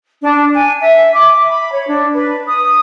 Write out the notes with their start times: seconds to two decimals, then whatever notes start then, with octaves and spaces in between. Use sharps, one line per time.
0.23 D4
0.53 G#5
0.80 E5
1.15 D6
1.48 B5
1.73 C#5
1.87 D4
2.14 B4
2.48 D#6